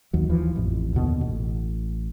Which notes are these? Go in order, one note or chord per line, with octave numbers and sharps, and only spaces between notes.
D#2 F#3
D#2 E3 F3
A1 F2
D#2 B2 D3
A1